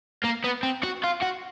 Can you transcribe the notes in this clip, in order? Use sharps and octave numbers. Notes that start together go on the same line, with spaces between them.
A#3
B3
C4
F#4
F4
F#4